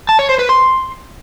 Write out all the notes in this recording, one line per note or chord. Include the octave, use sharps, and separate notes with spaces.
A5
C#5
C5
B4
C6